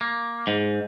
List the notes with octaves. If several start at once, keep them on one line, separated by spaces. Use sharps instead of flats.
A#3
G#2